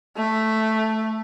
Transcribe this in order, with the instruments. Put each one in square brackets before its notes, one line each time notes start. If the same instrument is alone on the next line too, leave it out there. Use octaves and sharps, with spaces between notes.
[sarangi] A3